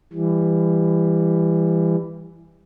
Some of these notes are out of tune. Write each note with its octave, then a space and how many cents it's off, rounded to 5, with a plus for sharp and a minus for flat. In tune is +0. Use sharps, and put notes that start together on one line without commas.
E3 +15 G3 +25